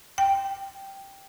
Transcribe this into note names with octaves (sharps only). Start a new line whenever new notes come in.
G5